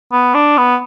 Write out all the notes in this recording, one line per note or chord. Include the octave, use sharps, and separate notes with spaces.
B3
D4
B3